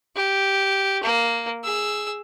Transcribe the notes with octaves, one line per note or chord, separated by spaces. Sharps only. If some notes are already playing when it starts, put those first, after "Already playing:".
G4
A#3
G#4 E6